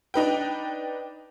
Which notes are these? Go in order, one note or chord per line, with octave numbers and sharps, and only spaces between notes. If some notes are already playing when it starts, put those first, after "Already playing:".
D4 D#4 B4 G5